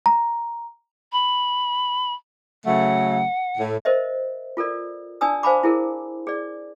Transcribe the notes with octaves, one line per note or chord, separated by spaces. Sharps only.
A#5
B5
C#3 F#3 A3 F#5
A2
A#4 C5 D#5 E5
F4 A4 A#4 D5
D4 D5 G#5 A5 D#6 E6
C5 F5 G#5 A5 B5 D6
E4 G#4 A#4
G#4 D5